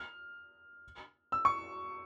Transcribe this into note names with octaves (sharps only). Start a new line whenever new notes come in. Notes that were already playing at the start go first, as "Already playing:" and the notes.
Already playing: F6
E6
C#6